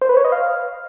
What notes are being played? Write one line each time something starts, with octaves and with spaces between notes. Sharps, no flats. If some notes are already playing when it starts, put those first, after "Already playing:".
C5
B4
C#5
D#5
F5